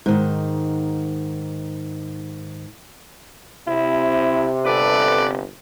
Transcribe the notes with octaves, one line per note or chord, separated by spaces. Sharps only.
G#2 D#3
C3 E4
G1 A4 B4 D5